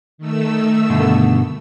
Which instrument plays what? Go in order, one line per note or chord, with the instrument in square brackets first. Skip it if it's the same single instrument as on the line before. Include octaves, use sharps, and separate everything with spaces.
[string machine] D#3 A3 E6
[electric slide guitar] G2 B2 D3